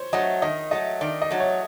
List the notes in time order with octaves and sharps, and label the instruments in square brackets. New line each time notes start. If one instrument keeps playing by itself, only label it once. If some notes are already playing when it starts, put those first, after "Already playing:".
Already playing: [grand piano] C5 C#5
[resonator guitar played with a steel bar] F#3 A3 [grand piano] D#5
[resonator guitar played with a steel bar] D#3 [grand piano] D#5
[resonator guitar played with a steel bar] F#3 A3 [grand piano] D#5
[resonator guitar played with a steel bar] D#3 [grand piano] D5
[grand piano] D#5
[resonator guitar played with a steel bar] F#3 A3
[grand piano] C#5